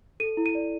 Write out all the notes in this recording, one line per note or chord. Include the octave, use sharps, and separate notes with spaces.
A4 D#7
E4
D#7
D5